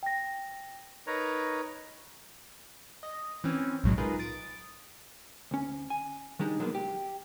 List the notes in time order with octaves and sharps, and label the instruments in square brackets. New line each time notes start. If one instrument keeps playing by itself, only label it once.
[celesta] G5 A#6
[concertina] D#4 A#4 B4 C#5 A#5
[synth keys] D#5
E3 C4 C#4
B1 A2 F#3 G#3
D#4 F4 G#4 A#4 B4
D#6 A6 D7
[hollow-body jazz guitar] D2 C#4
G#5
D#3 G3 G#3 D4 D#4
B2 F#3 G#3 A#3 B3
G4